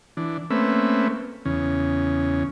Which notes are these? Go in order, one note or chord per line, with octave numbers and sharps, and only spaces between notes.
E3 D4
A3 A#3 C4 C#4 B4 E5
E2 C#3 C#4